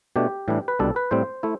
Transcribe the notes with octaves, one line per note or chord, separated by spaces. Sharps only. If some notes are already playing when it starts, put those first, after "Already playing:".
B2 A3 D4 G4
A2 E3 G3 D4
B4
C2 B2 G3 D4 A4
B4
A2 G3 C4 C5
A3 E4